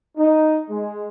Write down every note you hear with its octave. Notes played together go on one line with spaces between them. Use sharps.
D#4
G#3